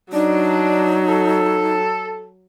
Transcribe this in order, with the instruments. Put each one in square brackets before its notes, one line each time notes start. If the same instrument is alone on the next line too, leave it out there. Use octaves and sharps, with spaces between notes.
[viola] F#3 [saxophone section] D4 [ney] D#4
[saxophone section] A4